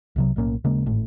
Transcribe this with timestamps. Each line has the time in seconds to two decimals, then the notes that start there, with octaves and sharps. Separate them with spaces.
0.16 C2 C3 F#3
0.36 B1 A2 A#3 C#4
0.64 D#1 C#3 G#3 A#3
0.86 G#1 A2